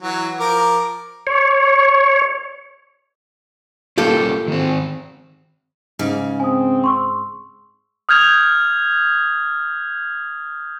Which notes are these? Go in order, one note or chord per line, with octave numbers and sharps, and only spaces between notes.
E3 F#3
F3 A#4 D6
C#5
G3 A#3 C#4 F4 G4 A4
D#3 C4
G#2 C#3
C4 G#5 D#6
C6 C#6 E6
D#6 F6 G6 G#6 F7